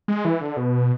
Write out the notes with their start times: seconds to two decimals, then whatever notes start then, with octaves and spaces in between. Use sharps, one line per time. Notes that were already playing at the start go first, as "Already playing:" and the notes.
0.08 G#3
0.25 E3
0.41 D3
0.57 B2